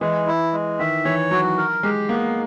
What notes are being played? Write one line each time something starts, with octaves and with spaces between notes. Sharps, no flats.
E3 G#3
E4
G#3
D#3 E5
E3 C#5
F#3 F#4
A#4
G#3 G4
A#3 B3